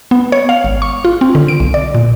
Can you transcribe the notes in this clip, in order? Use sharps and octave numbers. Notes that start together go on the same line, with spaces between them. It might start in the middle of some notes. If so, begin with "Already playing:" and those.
B3
C#5
F5
G#1
C#6
F4
C4
D3
D7
B1
D5
A#2